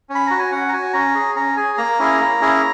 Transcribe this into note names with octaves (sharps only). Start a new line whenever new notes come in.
C#4
B5
F#4 A#5
G#5
C#4 F#5
A#5
F#4 G#5
C#4 A#5
G#4
C#4 A#5
G#4 G#5
A#3 A#5
C#4 E4 G#4
A#3
C#4 E4 G#4